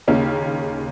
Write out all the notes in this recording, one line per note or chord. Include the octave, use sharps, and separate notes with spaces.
D#2 C#3 A#3 C#4